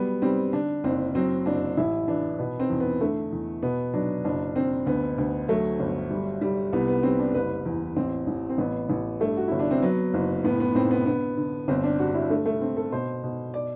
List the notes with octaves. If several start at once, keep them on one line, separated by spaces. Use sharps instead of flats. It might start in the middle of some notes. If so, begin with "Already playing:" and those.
Already playing: F#3 G3 B3
G3 C4
D3 D4
F#1 C4
F#3 C4
F#1 D4
A1 E4
E3 D4
B2 B3
C4
E2
B3
D3 A3
E2
B2 B3
F#3 D4
F#1 D4
D3 C4
D2 B3
D2
F#3 A3
G1
G3
G3
C2 B3
B3
G3 C4
D4
F#1 B4
E2
A1 C4
A1
C4
A1 B3
A1
G2 A3
F#4
G1 E4
D4
C4
F#3 B3
F#1
A2 B3
B3
A2 C4
B3
D3 B3
D3
G1 C4
D4
G2 F#4
E4
D3 A3
A3
D3 C4
A4
B2 C5
B2
D5